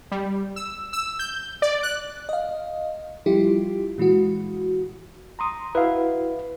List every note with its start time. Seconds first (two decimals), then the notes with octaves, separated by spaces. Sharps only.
0.11 G3
0.56 E6
0.93 E6
1.19 G6
1.62 D5
1.83 F#6
2.29 D#5 F5
3.26 F3 G3 E4 F4 G4
3.98 A#2 E3 G#3 F#4
5.39 A#5 C6 D#6
5.75 E4 F#4 B4 F5